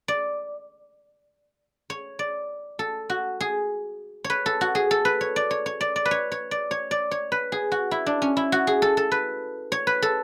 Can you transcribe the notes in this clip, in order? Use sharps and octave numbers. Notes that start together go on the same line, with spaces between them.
D5
C#5
D5
A4
F#4
G#4
C#5
B4
A4
F#4
G#4
A4
B4
C#5
D5
C#5
C#5
D5
D5
B4
C#5
C#5
D5
C#5
D5
C#5
B4
G#4
F#4
E4
D4
C#4
E4
F#4
G#4
A4
A4
B4
C#5
B4
A4